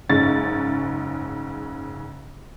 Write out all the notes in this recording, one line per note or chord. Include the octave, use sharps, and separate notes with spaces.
F#1 G#2 C#3 C#4 A6